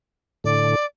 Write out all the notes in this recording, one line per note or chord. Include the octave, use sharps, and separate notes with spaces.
A2 D3 D5